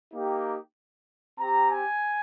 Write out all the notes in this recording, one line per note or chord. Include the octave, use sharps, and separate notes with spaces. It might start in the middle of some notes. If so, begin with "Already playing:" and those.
A#3 D#4 G4
C4 G4 A#5
G#5